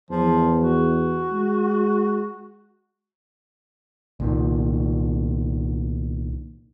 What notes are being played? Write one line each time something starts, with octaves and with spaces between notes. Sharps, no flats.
E2 F3
F#4
G#3
C2 A#2 D#3